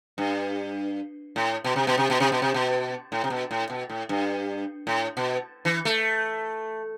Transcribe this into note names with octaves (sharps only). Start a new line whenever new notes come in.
G2
A2
B2
C3
B2
C3
B2
C3
B2
C3
B2
A2
C3
B2
A2
B2
A2
G2
A2
B2
E3
A3